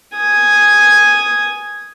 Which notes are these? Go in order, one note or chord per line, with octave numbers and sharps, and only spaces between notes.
G#5 D#6